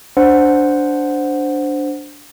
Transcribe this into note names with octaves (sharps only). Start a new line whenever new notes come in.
D4 C5 F#5